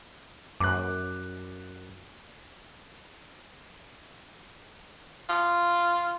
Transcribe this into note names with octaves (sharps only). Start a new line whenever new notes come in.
F#2 D6 F#6
F4